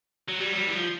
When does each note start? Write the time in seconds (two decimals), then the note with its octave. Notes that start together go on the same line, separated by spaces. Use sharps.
0.28 F#3
0.39 G3
0.51 F#3
0.56 G3
0.66 E3
0.73 F3